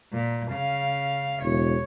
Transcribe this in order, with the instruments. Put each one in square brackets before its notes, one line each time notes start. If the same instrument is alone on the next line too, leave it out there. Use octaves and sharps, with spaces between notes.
[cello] A#2
C#3 F5
[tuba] E1 [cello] C#5